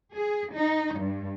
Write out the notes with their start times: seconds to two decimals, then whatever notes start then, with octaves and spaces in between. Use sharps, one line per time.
0.14 G#4
0.54 D#4
0.98 G2